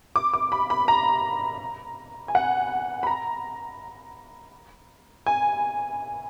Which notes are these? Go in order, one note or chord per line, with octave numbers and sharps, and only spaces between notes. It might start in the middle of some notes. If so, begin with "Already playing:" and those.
D6
D6
B5
B5
A#5
G#5
F#5
B5
A#5
G#5